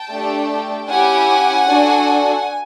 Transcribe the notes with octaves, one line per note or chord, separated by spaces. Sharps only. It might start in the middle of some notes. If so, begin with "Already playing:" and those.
Already playing: G5 A5
A3 D4 G4
C#4 E4 G4 F#5 G#5
D4 F#4 A4